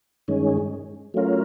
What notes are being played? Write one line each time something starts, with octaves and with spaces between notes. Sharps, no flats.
G2 D#3 G#3 C#4
F#3 A3 C#4 F4 A#4